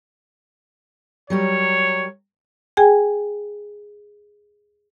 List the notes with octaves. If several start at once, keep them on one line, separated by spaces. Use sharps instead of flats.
F#3 G3 A#4 C#5
G#4 G5 G#5